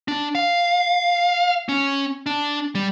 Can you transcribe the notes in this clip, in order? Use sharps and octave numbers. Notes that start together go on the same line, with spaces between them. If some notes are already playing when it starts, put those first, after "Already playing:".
D4
F5
C#4
D4
G3